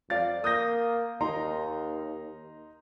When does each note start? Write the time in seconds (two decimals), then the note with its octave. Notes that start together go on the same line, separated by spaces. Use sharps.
0.10 F2 D5 F5 A6
0.44 A#3 D#6 G6 A#6
1.21 D#2 D#4 A#5 C6